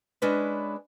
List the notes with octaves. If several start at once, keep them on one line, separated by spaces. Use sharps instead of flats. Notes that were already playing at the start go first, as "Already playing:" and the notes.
G#3 C#4 D4 E4 B4